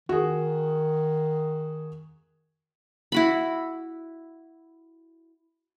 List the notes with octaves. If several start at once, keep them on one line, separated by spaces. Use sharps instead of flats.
D#3 F#4 G#4
E4 F#4 B5